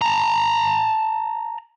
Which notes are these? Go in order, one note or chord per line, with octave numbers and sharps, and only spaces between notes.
A5 A#5